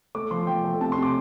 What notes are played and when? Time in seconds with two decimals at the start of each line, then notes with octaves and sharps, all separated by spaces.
0.15 A3 D6
0.31 F3 C6
0.47 F3 G5
0.64 A3
0.80 C3 A5
0.92 C6
0.98 C3 D6